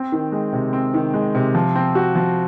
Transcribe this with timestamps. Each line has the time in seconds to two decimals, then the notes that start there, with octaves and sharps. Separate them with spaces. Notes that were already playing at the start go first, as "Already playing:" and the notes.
Already playing: C4
0.12 D#3
0.32 G#3
0.53 C3
0.73 C4
0.94 D#3
1.14 G#3
1.35 C3
1.55 F3
1.75 C4
1.95 F#4
2.16 F3